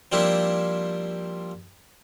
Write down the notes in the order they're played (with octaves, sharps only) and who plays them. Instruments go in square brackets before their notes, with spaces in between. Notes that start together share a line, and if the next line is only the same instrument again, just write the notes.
[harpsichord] F3 G3 A#3 C4 D4 E4